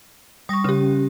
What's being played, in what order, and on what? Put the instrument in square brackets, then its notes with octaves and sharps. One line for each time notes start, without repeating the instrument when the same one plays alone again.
[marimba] G3 C#6 [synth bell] D#6 A#6
[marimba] C#3 [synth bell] C#4 G4